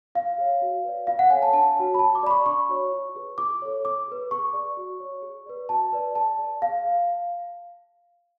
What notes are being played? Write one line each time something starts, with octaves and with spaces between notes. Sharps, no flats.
F4 F5
G#4 C#5
F#4
B4 D5
F4 F5
F#5
A4 C#5 G#5
A5
D4 A5
F#4 C#5
B5
F4 A5
D6
G#4 D5 B5
C#6
D4 C#6
F#4 C#5
F4
G#4 B4
F4 D6
A4 C#5
F4 D6
G#4 B4
G#4 C#6
D5
F#4
C#5
G#4
B4 D5
F#4 A5
B4 D5
G#4 A5
D5
G#4 F5